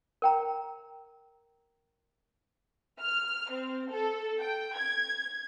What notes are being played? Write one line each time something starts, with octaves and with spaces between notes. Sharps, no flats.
A#4 G5 A#5
F6
C4
A4
G5
G#6